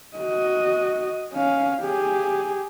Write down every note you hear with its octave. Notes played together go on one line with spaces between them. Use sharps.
F#4 D#5
C#4 F5
G4 G#4